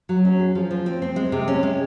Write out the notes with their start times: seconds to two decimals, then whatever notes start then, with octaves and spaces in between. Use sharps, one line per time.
0.09 F#3
0.25 C#4
0.39 G#4
0.55 F3
0.71 F3
0.86 C4
1.02 C4
1.16 G#3
1.32 C3
1.48 C#4
1.63 G#3